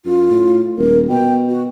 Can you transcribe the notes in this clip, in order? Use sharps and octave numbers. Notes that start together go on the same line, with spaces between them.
F#2 F4
A2
D#1 A#4
B2 G5
F#4